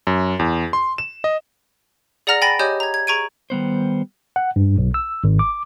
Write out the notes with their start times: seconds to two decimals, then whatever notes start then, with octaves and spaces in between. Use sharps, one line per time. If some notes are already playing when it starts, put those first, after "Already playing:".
0.07 F#2
0.39 E2
0.73 C6
0.98 E7
1.24 D#5
2.27 G#4 D5 F#5 A#5 F6 A#6
2.42 G5 G#5 B5 A6 A#6 D7
2.59 G4 C#5 D#5 G#5 D#6 G6
2.80 A#5 G#6
2.94 G#6
3.07 G#4 A#5 C#6 G#6 D7 D#7
3.50 D#3 G3 B3 C5
4.36 F#5
4.56 G2
4.78 B1
4.94 E6
5.24 G#1
5.39 D6